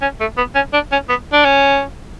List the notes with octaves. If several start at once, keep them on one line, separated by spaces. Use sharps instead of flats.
C#4
A3
B3
C#4
D4
C#4
B3
D4
C#4